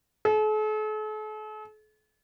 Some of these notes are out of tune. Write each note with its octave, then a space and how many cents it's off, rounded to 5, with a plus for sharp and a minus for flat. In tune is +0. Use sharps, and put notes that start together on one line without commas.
A4 -45